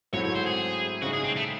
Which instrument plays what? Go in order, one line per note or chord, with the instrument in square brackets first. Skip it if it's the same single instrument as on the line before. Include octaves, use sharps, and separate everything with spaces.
[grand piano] G#2 F#3 A3 C4 E4 [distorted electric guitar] C#5
[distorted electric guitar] C#5
C5
G#4
[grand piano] C#3 G#3 D#4 [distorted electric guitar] F#4
[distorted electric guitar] G#4
C4
A3